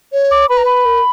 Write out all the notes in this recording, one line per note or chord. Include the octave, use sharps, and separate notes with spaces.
C#5
D6
B4 B5
A#5
B5
A#4